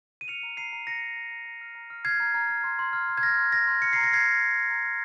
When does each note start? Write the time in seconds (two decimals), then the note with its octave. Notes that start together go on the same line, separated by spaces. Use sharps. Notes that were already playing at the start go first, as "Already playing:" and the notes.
0.21 D#7
0.28 F6 C#7 F7
0.43 A#5
0.57 A#5 C7 D#7
0.73 A#5
0.87 A#5 A#6 C#7
1.02 A#5
1.17 A#5
1.31 A#5
1.46 A#5
1.61 F6
1.75 A#5
1.90 F6
2.05 F6 G#6 C7
2.20 A#5
2.34 A#5
2.49 F6
2.64 C6
2.79 C6
2.93 F6
3.08 C6
3.17 G#6
3.23 F6 A#6
3.38 C6
3.52 C6 A#6
3.67 C6
3.82 F6 C#7
3.93 A#5 C7
4.03 A#6
4.11 F6 G#6 C7
4.26 A#5
4.40 F6
4.55 F6
4.70 A#5
4.84 F6